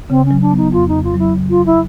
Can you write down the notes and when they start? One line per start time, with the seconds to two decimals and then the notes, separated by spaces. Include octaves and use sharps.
0.10 C#3 C4
0.25 C#4
0.31 F#3
0.41 D4
0.51 B3
0.57 D#4
0.72 F2 F4
0.88 C#3 D#4
1.04 F4
1.14 F#3 E4
1.35 C#3
1.50 F4
1.55 F#3
1.66 E4